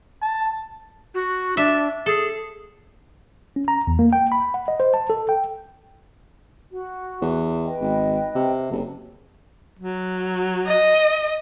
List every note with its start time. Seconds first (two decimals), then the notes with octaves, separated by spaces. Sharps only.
0.21 A5
1.14 F#4
1.57 D4 E5
2.06 G#4 A4
3.56 C#4
3.68 A#5
3.87 E2
3.99 A#3
4.13 G5
4.32 B5
4.54 F#5
4.68 D#5
4.80 C5
4.94 A5
5.10 A4
5.29 G5
6.71 F#4
7.22 E2
7.65 B4 D#5 G5
7.81 G#1
8.35 C3
8.71 F#1
9.79 F#3
10.67 D#5